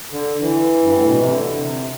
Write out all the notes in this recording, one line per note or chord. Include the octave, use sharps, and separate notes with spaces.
D3
E3
G2
A2
B2
C3
D3
C3